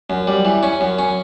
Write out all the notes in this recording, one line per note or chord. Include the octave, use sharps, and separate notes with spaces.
F#2
G3
E3
C#4
F#2
C#4